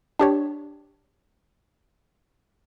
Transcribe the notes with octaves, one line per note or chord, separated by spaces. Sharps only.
D4 G4 C#5